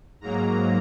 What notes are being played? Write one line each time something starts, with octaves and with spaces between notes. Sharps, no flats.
G#2 F#3 A#3 A#5